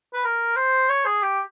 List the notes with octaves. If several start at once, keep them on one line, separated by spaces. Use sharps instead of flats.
B4
A#4
C5
C#5
G#4
G4